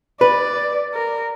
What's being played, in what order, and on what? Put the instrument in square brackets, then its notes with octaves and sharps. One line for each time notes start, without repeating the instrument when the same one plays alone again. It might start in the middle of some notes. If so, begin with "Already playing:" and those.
[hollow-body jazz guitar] B4 [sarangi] D5
[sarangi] A#4